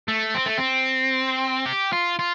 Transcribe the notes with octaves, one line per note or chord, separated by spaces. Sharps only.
A3
C4
A3
C4
G4
F4
F4